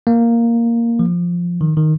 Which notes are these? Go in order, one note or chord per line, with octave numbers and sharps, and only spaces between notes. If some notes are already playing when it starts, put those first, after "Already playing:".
A#3
F3
D#3
D#3